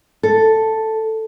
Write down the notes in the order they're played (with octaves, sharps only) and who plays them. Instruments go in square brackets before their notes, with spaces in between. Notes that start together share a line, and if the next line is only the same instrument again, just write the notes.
[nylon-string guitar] A4